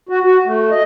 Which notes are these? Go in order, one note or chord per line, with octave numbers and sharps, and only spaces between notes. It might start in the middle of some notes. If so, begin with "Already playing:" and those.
F#4
F#4
A3
D#5